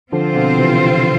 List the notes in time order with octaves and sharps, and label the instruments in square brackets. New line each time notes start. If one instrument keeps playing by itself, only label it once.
[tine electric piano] D3 F3 [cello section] C4 F4 C5
[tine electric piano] B2 D3
C3 E3